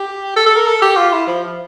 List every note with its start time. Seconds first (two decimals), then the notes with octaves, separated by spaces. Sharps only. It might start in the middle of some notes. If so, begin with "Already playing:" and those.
Already playing: G4
0.36 A4
0.46 A4
0.56 A#4
0.67 A4
0.82 G4
0.97 F4
1.12 E4
1.27 F3